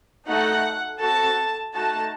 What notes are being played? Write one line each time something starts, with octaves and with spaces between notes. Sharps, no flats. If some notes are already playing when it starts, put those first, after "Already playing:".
A3 D#4 F#4 A4 F#5
C4 F#4 A4 A5
A3 D#4 F#4 A5